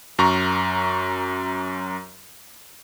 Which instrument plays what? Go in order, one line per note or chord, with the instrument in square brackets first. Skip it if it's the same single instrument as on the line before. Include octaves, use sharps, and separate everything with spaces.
[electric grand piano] F#2 A#5 C#6